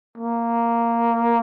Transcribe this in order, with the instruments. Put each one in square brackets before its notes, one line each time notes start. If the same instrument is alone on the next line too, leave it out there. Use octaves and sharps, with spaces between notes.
[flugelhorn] A#3